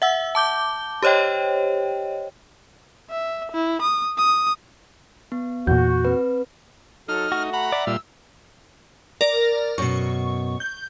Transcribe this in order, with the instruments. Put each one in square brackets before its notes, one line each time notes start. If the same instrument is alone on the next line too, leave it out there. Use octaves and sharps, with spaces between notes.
[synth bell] E5 F#5 E6
A5 D6 G6 G7
G4 C5 C#5 D#5 G5
[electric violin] E5
E4
D#6
D#6
[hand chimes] B3
[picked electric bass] E2 A#2 [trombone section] F#4 [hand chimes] G6
[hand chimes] C4 B4
[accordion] F#3 A4 [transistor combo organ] D#4 [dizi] F6
[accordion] A3 [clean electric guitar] F#4
[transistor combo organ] F#5 A#5 [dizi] B5
[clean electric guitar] D5 [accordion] E5
[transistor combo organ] A#2 G3 F4 [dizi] E6
[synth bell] A#4 D5 A#6
[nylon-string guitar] F#2 B2 [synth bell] C#6
[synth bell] G6